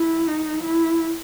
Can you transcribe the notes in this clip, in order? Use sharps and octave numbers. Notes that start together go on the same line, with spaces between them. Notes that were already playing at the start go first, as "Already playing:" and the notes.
Already playing: E4
D#4
E4